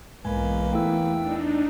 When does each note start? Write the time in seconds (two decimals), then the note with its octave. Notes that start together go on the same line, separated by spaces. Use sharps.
0.25 B1 E2 G#2 G#3 A#3 B4 G#5
0.73 A3 E4 G5 E6
1.16 D4 D#4